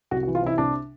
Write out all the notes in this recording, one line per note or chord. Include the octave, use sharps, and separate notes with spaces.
C2 F#4
F#4
E3
F4
C3 E4
C2 D4